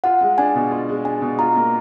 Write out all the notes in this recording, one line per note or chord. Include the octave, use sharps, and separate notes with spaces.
F4 F#5
G#3
D4 G#5
B2
F4
G#3
D4 G#5
B2
F4 A#5
A#3